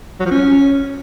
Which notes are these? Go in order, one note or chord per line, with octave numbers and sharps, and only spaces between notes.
F#3
F3
C#4